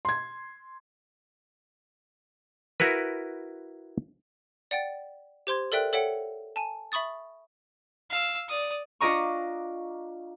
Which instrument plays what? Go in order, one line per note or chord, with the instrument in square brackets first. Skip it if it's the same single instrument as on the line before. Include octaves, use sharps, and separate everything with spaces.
[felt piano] C6 G#6
[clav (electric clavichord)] E4 F#4 A#4 B4
[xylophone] D5 F#5 G5 A6
G4 C5 C6 G#6
A4 A#4 D5 E5 G5 F#6
A4 C#5 E5 F#5 G5 C#7
G#5 A5
E5 B5 C#6 D#6 A6
[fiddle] F5 E6
D5 D#6
[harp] D4 F4 D5 D#5 A#5 C#6